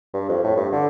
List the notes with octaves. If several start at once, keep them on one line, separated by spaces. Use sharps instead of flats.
G2
F2
A2
G2
D3